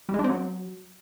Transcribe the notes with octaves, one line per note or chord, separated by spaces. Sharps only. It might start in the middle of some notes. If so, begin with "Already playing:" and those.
G3
G#3
D4
C4
F#3